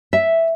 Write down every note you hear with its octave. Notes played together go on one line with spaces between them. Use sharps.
E5